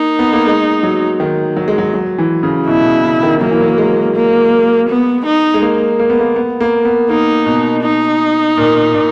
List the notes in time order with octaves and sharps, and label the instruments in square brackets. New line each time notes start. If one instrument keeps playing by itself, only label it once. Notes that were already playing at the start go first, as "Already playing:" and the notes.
Already playing: [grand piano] A#3 [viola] D#4
[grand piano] B3
A#3
G#3
F#3
D#3
F#3
G#3
F#3
F#3
E3
C#3
[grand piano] B2 [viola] E4
[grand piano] B2
C#3
C#3
D#3
[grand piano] F#3 [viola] A#3
[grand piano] E3
F#3
G#3
[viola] A#3
B3
D#4
[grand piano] G#3
A#3
A#3
B3
A#3
B3
A#3
B3
[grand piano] A#3 [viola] D#4
[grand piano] B2
[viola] D#4
[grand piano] A#2
A#2